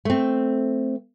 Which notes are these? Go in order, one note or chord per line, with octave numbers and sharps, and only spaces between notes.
A3 C4